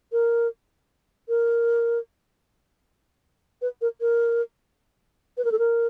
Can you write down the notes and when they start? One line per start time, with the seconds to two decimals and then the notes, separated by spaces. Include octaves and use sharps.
0.12 A#4
1.29 A#4
3.62 B4
3.81 A#4
4.01 A#4
5.37 B4
5.45 A#4
5.52 A4
5.59 A#4